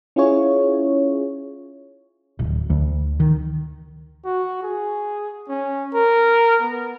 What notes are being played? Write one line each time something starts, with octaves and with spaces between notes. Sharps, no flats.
C#4 E4 F4 G#4 C#5
D1
D2
D#3
F#4
G#4
C#4
A#4
B3